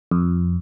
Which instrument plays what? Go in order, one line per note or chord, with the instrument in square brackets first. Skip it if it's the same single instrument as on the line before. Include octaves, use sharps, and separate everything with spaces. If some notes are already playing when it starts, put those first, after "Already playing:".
[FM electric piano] F2